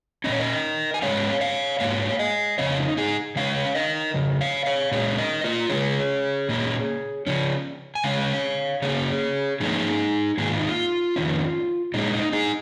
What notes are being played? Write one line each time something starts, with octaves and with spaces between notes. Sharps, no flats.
F3 C#4 D#5
A#2 C#5
A#4 D#5
G#5
G#2 D#3 G#3 C#4 C#5 F5
C#5 F5
G#2 D#3 A#3 C#5 F5
D#5 G#5
F2 C#3 F3 C#4 C#5 F5
D#4
D#4 G#4
C#3 G#3 C#4 C#5 F5
A#4 D#5
F2 C#3
C#5 F5
C#5 F5
A#2 G#3 C#4 G#4 C#5
A#4 D#5
F4 A#4
C#3 G#3 C#4 G#4 C#5
A#2 A#3 C#4
C#3 F3 C#4
G#5
C#3 G#3 C#4 C#5 F5
C#3 A#3 C#4 G#4 C#5
G#2 F3 A#3 C#4 D#4 G#4
G#2 D#3 A#3 G#4
F4
D#4
F4
F2 D#3 C#4
A#2 G#3 C#4 D#4
D#4
D#4 G#4